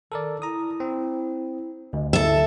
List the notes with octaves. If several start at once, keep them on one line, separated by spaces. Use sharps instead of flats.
D#3 A4 A#4 D5
E4 A#5 D#6
C4
D2 D#5
E4 A4 E5